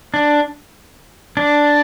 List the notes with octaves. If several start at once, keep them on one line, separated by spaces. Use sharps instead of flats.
D4
D4